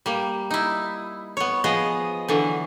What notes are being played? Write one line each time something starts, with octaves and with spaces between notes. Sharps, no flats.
G3 A#3
D#4 E4
B3 C#5
F3 B3 G#4 D#5
D3 E3 F#3